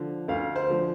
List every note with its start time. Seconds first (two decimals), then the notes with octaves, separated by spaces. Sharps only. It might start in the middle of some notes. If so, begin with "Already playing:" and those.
Already playing: D3 F3
0.28 D2 F5
0.56 C5
0.70 D3 F3